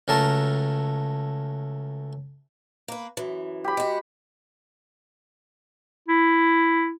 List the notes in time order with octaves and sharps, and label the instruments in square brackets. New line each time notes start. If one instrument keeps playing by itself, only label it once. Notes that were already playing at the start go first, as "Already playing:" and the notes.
[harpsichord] C#2 F#3 A3 A#4 A5
[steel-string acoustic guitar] A#3 B4
F#2 E3
[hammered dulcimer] G4 B5
[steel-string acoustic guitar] G#3 F#4
[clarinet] E4